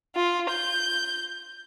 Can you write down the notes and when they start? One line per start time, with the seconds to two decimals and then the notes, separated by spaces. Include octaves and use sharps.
0.15 F4
0.51 G6